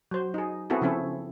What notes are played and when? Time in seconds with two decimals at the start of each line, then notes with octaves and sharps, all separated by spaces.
0.11 F#3 C5
0.34 D#4 G#4
0.70 B3 C4 E4 F#4 G#4 A4
0.81 C#3 F3 C4 C#4 E4 A4